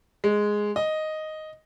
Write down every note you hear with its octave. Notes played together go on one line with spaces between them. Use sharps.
G#3
D#5